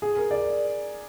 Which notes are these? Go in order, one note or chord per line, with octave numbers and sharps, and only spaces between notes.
G#4
A#4
D5